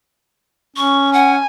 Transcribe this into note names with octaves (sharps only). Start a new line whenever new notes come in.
C#4 C#6
F#5 G#5